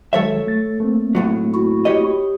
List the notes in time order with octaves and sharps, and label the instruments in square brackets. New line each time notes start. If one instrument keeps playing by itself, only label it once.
[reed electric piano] D#3 F#3 G#3 [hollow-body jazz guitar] A4 C#5 E5
[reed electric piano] A3 A6
A3 A#3 C4
[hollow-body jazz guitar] B1 A2 F#3
[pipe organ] E4 F#4
[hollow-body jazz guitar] G4 C#5 D#5